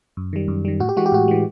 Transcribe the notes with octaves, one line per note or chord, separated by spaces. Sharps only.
F#2
D#3 G3
F#2
D#3 G3
A2 F#4
G4
E3 G#3 F#4
G4
A2 F#4
E3 G#3